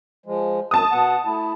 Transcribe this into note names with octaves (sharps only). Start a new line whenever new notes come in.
F3 G#3
F#2 A5 D#6
B2 B3 F#5
A3 E4